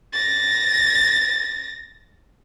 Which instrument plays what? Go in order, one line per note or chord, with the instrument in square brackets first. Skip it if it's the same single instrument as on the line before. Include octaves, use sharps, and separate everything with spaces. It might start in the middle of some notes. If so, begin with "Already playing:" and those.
[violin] A6 A#6